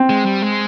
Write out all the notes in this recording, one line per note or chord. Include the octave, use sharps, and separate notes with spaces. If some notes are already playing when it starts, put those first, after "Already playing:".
Already playing: C4
G#3
G3
G#3